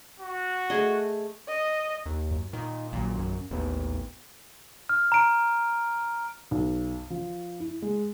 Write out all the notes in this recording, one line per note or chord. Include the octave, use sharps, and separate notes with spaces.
F#4
A3 G#4 D#5
D#5
D#2
F#2
A#2 D#3
A#1 A#2 D#3 F#3
F#2
A1 D#2 B3
F6
A#5 D7
B1
F3
E4
G#3